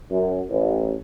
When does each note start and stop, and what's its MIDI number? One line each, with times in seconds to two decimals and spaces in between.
0.11 0.42 42
0.50 0.94 33